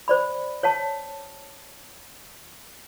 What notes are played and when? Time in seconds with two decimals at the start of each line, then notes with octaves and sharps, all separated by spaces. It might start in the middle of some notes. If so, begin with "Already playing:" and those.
0.08 C5 D5 B5
0.63 C#5 F#5 A5